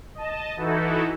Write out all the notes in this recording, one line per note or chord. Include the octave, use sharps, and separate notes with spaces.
D#5 A5
E3 D#4 E4 F#4 A4